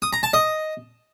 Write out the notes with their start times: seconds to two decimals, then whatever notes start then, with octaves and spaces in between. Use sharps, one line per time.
0.02 D#6
0.13 A#5
0.23 A5
0.33 D#5